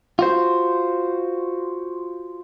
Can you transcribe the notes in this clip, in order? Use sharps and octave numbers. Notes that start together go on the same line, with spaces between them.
F4 F#4 C5